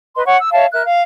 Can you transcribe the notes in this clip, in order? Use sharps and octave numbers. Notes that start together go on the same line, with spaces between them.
B4 D#5 C6
C#5 F#5 C#6
E6
C#5 E5 F5 A5
A#4 E5 F#6
F5